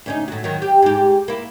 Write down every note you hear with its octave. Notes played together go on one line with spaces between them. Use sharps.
D2 C#4 D#4
A2 F#3
D#3 F#3
G4
G#2 G4
A#3 E4